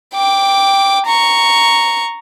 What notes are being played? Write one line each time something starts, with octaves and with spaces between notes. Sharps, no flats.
G5 D6
A#5 C#6